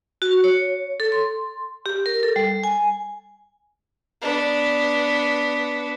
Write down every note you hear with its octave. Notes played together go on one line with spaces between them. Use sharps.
F#4
C#5
A4
C6
G4
A#4
A4
G3
G#5
B3 D4